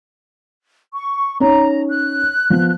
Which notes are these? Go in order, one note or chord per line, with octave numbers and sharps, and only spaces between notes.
C#6
C#4 D#4 C#5 A#5
F#6
F3 B3